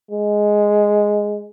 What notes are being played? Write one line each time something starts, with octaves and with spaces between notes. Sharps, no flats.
G#3